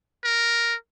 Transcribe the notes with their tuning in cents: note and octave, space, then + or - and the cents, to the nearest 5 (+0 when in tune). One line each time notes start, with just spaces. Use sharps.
A#4 +0